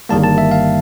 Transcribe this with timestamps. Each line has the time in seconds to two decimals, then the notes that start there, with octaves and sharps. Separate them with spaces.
0.09 G1 G2 D#3 G3 A#3 A5
0.24 A5
0.38 E5
0.51 F5